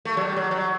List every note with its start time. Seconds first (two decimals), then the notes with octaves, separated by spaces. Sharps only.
0.05 A3
0.17 F#3
0.21 G3
0.36 F#3
0.51 F#3